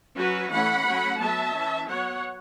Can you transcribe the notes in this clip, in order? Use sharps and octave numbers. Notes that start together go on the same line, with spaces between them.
F#3 C#4 F#4 B4
E3 A3 C#4 F#5 B5
F#3 A3 C#4
F#3 B3 E5 A5
E3 C#4
F#3 B3 C#5 F#5